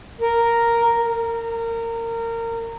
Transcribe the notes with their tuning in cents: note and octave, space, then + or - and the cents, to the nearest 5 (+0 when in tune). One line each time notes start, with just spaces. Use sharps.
A#4 +0
A#4 -25